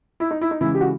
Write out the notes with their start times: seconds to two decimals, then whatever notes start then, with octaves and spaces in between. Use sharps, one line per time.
0.20 E4
0.31 D#4
0.41 E4
0.51 D#4
0.61 C#3 E3 G#3 E4
0.74 G4
0.81 F#4